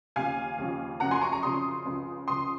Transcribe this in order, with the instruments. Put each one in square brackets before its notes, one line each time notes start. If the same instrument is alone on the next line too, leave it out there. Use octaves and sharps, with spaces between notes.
[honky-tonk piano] D#2 C#3 F3 F5 G#5
D#2 C#3 F3
F#2 C#3 F3 F#5 A#5
G#5 C6
A#5 C#6
A#5 C#6
F#2 C#3 F3 C6 D#6
C#2 C#3 F3
C#2 C#3 F3 C6 D#6